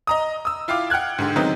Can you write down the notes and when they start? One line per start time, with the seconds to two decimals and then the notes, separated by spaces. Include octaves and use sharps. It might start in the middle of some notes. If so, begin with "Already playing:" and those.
0.07 D#5 A#5 D#6
0.45 D#6 E6
0.68 E4 F4 F5 G5 D6
0.90 F#5 G5 F6 F#6 G#6
1.18 G#2 D3 G4
1.36 D#3 F#3 G#3 B3 C4 D#4